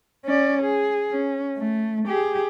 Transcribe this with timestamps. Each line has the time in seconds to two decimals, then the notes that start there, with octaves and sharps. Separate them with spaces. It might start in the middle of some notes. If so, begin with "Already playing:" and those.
0.25 C#4 D5
0.62 G#4
1.12 C#4
1.58 A3
2.08 G4 G#4